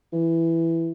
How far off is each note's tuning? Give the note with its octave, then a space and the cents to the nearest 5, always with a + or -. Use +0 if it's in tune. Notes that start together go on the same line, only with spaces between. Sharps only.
E3 +5